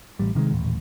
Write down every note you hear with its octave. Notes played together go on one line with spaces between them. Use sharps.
A1 G3
C3 D#3 F3 G#3
D#1 A1